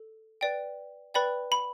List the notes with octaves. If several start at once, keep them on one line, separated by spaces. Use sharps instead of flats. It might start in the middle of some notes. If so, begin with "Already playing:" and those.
Already playing: A4
B4 D5 G5
B4 D5 G5 B5
B5